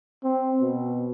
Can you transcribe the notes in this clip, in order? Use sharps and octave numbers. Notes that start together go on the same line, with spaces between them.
C4
B2